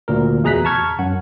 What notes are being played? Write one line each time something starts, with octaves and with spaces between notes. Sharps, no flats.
D2 A#2 A#4
E2 B2 G#4 A#5 F#6 B6
A5 A#5 C#6 F6 G#6
F#2 F#5